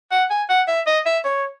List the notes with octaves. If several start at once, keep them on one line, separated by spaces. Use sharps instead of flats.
F#5
G#5
F#5
E5
D#5
E5
C#5